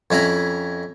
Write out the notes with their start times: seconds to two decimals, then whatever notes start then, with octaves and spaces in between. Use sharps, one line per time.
0.10 F2 C#4 E4 A#5 B5